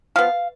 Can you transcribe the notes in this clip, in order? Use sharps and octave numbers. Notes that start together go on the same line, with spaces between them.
F3 B3 F5